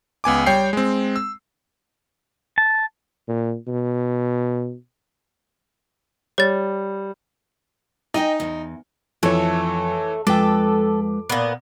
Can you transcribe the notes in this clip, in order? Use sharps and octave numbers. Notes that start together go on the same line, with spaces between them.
C#2 B3 G#5 D6
G3 C#5 G5 C7
G#3 C4
E6
A5
A#2
B2
G3 C#5 A6
D#4 D#5 G5 G#5
E2
F2 E3 A3 C#5
F2 G#3 A4 B4 G5 D6
A#2 B3